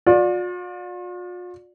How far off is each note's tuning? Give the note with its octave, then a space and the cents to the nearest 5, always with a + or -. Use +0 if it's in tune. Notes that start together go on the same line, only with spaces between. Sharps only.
F4 +45 D5 +0